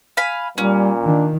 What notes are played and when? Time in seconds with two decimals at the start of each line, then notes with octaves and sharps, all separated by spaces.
0.17 F5 G#5 B5
0.58 A#2 G3 C#4
1.04 D#3 D4